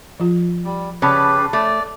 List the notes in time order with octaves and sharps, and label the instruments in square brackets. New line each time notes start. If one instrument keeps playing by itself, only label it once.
[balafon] F3 F4
[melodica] G3
[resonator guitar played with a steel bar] C#3 [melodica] G4 B4 [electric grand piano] C#5 A5 B5
[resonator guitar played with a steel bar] A3 [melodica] D5